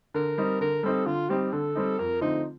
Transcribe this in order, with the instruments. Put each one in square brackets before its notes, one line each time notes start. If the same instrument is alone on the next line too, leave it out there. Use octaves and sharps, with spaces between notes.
[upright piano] D3 [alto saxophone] A#4
[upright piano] G3 C4 D#4
[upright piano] D3 [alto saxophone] A#4
[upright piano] G3 C4 D#4 [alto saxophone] A4
[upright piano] D3 [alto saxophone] F4
[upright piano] G3 C4 D#4 [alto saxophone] G4
[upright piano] D3 [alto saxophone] A4
[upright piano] G3 C4 D#4
[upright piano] F2 [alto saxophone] A#4
[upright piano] D3 F3 A3 C4 [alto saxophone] D#4